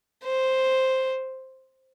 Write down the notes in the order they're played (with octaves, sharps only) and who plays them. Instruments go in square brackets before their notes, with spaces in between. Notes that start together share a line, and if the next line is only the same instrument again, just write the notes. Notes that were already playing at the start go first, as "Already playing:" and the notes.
[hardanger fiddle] C5